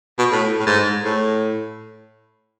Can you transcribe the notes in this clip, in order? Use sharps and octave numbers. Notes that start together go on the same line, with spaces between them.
B2
A2
A2
G#2
A2